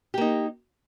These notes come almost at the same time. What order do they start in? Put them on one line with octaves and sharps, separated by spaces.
G4 A#3 D#4